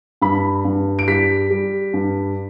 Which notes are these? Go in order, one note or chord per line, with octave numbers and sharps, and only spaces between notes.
G2 B5
G2
D7
G3 B6
G3
G2